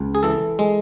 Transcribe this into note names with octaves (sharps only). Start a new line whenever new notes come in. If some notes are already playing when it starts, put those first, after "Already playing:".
Already playing: C#2
G#4
E3 A4
G#3